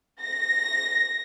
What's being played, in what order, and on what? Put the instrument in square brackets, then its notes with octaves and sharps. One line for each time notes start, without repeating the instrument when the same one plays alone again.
[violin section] A#6